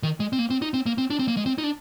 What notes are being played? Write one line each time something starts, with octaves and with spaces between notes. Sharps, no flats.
D#3
G#3
C4
A#3
C4
D#4
C4
A#3
C4
D4
C4
A#3
G#3
C4
D#4
D4